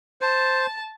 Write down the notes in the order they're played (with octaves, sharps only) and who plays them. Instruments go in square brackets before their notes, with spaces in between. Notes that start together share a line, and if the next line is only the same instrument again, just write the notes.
[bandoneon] C5 [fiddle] A5